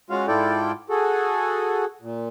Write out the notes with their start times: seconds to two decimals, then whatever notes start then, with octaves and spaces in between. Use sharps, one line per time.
0.10 G#3 C#4 F4 F#4 F5
0.28 G#2 E4 F4 A4 D5 G5
0.90 F#4 G#4 A4
2.01 A#2